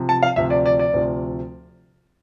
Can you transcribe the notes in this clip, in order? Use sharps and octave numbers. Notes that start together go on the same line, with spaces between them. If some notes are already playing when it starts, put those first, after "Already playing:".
Already playing: C3 F3
A5
F5
D2 C3 F3 E5
D5
D5
D5
D2 C3 F3